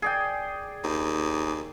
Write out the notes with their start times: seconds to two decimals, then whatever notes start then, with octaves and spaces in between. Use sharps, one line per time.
0.02 G#4 D5 G5
0.84 D#2